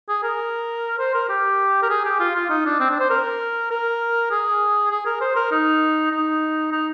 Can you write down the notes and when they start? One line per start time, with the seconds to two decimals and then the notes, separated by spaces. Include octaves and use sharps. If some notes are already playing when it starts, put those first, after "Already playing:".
0.09 G#4
0.24 A#4
0.99 C5
1.14 A#4
1.29 G4
1.83 A#4
1.90 G#4
2.05 G4
2.20 F4
2.35 F4
2.50 D#4
2.66 D4
2.80 C4
2.91 D4
3.00 C5
3.10 A#4
3.71 A#4
4.31 G#4
4.91 G#4
5.06 A#4
5.21 C5
5.36 A#4
5.52 D#4
6.11 D#4
6.72 D#4